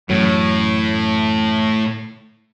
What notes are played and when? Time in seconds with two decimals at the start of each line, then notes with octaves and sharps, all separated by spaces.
0.09 A1 F#2 A2 F#3